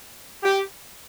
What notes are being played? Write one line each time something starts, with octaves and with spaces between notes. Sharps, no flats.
G4